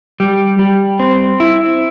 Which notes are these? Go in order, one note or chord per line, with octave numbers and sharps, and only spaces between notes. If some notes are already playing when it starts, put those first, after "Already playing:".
G3
G3
C4
E4